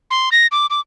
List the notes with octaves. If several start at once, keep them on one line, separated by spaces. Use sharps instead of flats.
C6
A#6
D6
D6